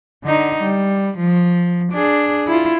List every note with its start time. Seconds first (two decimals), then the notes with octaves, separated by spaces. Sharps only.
0.24 D3 D#4
0.63 G3
1.18 F3
1.93 D4 G#4
2.47 E4 F4